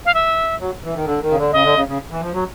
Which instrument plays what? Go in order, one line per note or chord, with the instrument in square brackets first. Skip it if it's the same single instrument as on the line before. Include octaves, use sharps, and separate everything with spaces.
[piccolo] F5
E5
[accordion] F#3
E3
D#3
D3
D#3
C#3
D3
[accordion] C#3 [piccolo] D#5
[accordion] D3
C#3
C#3
E3
F3
F#3